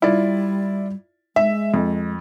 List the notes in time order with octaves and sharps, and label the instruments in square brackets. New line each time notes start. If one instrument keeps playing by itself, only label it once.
[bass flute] G3 [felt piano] E4 F4 D5
[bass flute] G#3 [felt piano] E5
[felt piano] F2